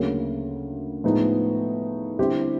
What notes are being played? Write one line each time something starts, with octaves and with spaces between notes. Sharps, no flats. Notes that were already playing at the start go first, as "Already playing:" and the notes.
Already playing: D2 C#3 F#3 A#3
A2 F3 G#3 B3 D#4
D3 G3 C4 E4 G4